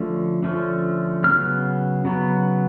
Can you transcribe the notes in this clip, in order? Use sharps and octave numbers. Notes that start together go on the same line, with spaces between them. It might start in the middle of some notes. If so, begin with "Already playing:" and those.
Already playing: D3 F3 A3 C#4
D3 F3 A3 C#4
C#3 F#3 B3 F6
C#3 F#3 B3